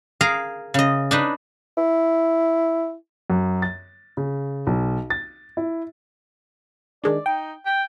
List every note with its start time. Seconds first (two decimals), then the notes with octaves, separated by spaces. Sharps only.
0.21 G#4 A#4 F5 A#5
0.74 C#3 D#5
1.11 D4 D#4 B4
1.77 E4
3.30 F#2
3.62 A6
4.17 C#3
4.67 B1
5.10 A6
5.57 E4
7.04 D#3 G#3 D4 D5
7.26 D#4 G5
7.66 G5